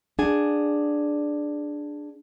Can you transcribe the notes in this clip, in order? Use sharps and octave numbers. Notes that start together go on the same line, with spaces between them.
D4 G#4 F#5 G#5